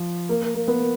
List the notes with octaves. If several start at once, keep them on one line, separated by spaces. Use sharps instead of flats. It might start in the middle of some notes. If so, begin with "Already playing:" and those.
Already playing: F3
A#3
A#3
A#3
B3
A#3